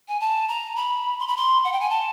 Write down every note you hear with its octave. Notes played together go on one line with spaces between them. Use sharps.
G#5
A5
A#5
B5
C6
B5
C6
F#5
G5
G#5
A5